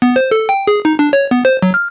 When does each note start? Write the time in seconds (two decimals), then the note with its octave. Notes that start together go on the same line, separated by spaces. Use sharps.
0.02 B3
0.16 C5
0.31 A4
0.49 G5
0.67 G#4
0.85 D#4
0.99 D4
1.13 C#5
1.31 B3
1.45 C5
1.62 F#3
1.74 F6